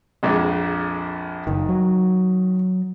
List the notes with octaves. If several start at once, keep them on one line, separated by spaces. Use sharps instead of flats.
A#1 F2 G#3
F#1 D#3
F#3